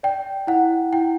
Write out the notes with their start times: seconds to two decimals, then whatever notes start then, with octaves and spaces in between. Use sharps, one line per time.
0.03 D5 G5
0.47 E4 F#5
0.93 E4 G5